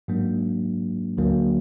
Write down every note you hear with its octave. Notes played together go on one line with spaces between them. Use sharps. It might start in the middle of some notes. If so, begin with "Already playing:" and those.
G#2 F#3 A#3 D4
D2 D3 F#3 A#3